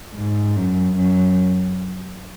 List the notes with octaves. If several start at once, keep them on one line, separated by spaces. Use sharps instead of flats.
G#2
F#2
F#2